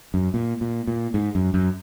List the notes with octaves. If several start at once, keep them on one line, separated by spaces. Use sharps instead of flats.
F#2
A#2
A#2
A#2
G#2
F#2
F#2